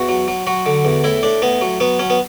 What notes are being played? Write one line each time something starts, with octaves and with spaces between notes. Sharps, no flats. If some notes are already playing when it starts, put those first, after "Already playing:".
Already playing: E2 F#4
F#3
F#3
F#3 F#4
D3
E2
A2 E4
A2 D4
A2 B3
F#3
F#3 B3
F#3 C#4
B3